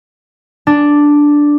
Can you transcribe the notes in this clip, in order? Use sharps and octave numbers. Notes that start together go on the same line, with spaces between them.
D4